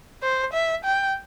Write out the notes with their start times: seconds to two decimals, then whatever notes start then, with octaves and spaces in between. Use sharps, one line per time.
0.22 C5
0.53 E5
0.85 G5